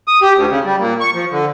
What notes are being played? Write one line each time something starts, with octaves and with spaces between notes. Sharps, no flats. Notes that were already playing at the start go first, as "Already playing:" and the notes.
D#6
G4
D2
C#3
G3
A#2
C#6
F3
D3